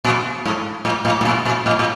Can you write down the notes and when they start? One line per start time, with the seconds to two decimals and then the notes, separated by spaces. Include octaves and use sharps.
0.04 A#2
0.46 G#2
0.85 A2
1.05 A2
1.21 A2
1.25 A#2
1.45 A#2
1.66 A2
1.79 A2